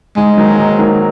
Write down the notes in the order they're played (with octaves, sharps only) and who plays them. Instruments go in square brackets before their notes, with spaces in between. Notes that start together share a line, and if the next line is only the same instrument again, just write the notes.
[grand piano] G#2 [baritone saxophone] G#3
[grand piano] D#3 F#3 A#3
G#2
D#3 F#3 A#3